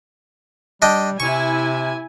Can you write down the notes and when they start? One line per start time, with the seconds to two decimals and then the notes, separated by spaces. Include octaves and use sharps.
0.82 G3 D4 D#5 G5
1.20 C3 E4 G#5 C#6